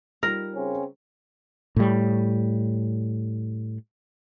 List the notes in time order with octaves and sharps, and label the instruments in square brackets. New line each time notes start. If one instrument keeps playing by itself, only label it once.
[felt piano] G3 D#4 F4 [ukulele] A#4
[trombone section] C#3 C4 C#4
[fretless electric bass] A2 G3